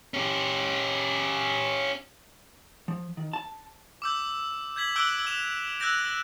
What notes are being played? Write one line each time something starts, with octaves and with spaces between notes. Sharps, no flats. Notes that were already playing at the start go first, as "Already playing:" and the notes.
C#4 G4
F3
D#3
A5
D6 E6 G6
G6 G#6 B6 F#7
D6 E6 F#6 G6 D7 G7
E6 E7 F7
E6 F#6 G6 A#6 D7